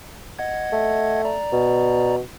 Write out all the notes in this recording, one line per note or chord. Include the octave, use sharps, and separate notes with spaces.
D#5 F#5 G#6
A3
D5 A#5
B2